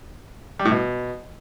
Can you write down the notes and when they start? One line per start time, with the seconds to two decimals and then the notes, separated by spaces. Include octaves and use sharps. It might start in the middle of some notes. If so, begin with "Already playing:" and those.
0.59 G3
0.65 A2
0.71 B2